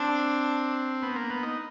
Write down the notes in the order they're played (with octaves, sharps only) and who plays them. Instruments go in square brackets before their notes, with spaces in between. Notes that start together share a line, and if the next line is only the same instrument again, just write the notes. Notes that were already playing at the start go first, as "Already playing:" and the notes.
Already playing: [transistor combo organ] C4 [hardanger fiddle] D4
[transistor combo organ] B3
A#3
B3
D#4